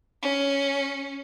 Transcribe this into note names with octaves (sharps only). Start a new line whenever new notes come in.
C#4